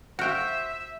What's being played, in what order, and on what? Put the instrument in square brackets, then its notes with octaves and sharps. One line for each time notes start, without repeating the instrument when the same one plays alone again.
[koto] F#4 G5 [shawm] C5 [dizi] E5 [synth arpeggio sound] F5 F6